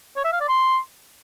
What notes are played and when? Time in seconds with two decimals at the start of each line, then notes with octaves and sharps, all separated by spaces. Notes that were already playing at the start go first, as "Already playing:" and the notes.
0.16 C#5
0.24 E5
0.32 F5
0.40 D5
0.49 C6